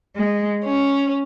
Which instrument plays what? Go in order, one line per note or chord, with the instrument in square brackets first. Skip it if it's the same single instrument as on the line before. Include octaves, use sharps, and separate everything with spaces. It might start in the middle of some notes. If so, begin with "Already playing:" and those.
[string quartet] G#3
C#4